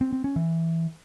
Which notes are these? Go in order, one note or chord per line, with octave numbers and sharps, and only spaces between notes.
C4
C4
C#4
E3